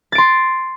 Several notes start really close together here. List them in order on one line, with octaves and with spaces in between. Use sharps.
A6 D7 C6